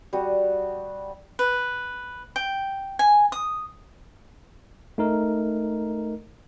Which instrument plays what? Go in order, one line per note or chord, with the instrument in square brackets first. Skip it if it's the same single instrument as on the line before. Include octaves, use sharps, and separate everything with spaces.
[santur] G3 F#4 C#6 D#6
[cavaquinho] B4
G5
G#5
D#6
[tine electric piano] A3 D#4 A#4